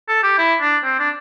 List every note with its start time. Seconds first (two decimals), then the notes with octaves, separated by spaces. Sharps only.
0.08 A4
0.23 G4
0.38 E4
0.61 D4
0.84 C4
0.99 D4